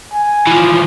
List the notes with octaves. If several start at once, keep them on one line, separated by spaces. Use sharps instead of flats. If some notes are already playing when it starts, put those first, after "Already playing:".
G#5
E3 F3